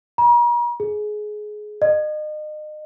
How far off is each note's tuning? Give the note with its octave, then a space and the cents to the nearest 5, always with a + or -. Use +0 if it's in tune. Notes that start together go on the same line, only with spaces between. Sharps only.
A#5 +45
G#4 +20
D#5 -35